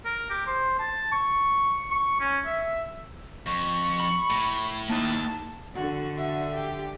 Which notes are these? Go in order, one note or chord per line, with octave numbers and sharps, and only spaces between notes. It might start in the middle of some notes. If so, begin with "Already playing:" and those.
A#4
G4
C5
A5
C#6
C#6
C#4
E5
F2 C#6
B5
A2
A#3 D#4 A5
D3 F#4
F#4 E5
G4